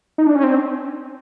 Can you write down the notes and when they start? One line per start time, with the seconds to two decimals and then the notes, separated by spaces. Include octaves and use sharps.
0.18 D#4
0.27 D4
0.35 C#4
0.44 C4